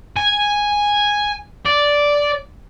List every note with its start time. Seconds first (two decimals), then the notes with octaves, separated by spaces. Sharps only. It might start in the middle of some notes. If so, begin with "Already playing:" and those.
0.17 G#5
1.65 D5